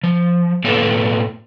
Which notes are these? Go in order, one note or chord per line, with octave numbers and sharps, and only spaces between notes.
F3
A2 A#3 B3 A4 C#5